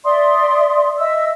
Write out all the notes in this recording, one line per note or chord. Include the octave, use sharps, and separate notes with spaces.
D5 E5 C6 D#6
D#5 E5 E6